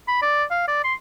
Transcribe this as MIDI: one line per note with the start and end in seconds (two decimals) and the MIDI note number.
0.08 0.19 83
0.22 0.44 74
0.51 0.64 77
0.68 0.84 74
0.84 0.94 84